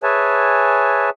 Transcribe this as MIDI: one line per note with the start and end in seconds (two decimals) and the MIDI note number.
0.03 1.10 68
0.03 1.10 71
0.03 1.10 73
0.03 1.10 76
0.03 1.10 80
0.03 1.10 81